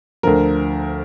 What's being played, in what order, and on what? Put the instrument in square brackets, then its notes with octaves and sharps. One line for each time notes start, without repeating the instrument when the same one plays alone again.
[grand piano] D2 D3 F3 A#4